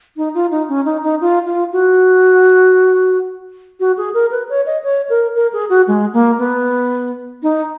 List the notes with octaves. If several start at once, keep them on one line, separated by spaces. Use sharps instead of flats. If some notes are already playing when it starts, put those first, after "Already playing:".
D#4
F4
D#4
C#4
D#4
D#4
F4
F4
F#4
F#4
G#4
A#4
B4
C#5
D#5
C#5
A#4
A#4
G#4
F#4
G#3
A#3
B3
D#4